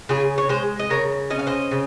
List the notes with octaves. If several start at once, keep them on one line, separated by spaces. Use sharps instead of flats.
C#3 F4 G#4
C#5
G#3 G#4 C5
D#5
C#3 A#4 C#5
C#4 D#5
F5
C5 D#5
C#3